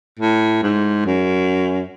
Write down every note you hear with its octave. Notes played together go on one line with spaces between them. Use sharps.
A2
G#2
F#2